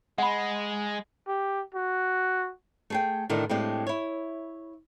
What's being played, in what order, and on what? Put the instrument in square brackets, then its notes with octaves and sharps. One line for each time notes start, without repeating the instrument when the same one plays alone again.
[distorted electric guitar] G#3 [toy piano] F#5 B5
[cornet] G4
F#4
[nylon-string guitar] A3 G#4 G5
A2 D3 D#3
A2 G#3 C4 D4 G4
E4 C#5